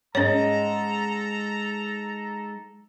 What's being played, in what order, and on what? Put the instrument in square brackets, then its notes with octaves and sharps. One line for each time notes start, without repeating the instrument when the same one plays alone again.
[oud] G#2 G#3 [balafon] C#4 C#5 [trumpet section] A4 A#5